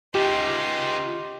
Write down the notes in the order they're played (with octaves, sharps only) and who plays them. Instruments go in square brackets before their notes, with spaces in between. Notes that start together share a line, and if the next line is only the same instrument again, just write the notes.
[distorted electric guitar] C#2 C#3 [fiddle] D#4 C6 [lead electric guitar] F4 E5 [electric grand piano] G4